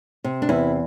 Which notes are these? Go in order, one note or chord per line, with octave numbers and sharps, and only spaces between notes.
C3
D4
E2 E4